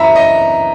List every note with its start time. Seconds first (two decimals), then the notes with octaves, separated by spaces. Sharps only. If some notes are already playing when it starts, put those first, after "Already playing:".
Already playing: F#2 E3 E5 A#5 B5
0.16 D#5